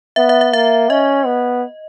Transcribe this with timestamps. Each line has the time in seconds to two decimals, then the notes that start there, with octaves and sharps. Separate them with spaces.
0.16 B3 E5
0.29 E5
0.41 E5
0.53 A#3 E5
0.90 C#4 D#5
1.26 B3